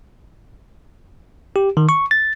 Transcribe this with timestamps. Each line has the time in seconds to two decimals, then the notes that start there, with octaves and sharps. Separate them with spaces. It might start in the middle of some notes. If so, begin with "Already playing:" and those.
1.56 G4
1.77 D#3
1.89 C#6
2.11 A6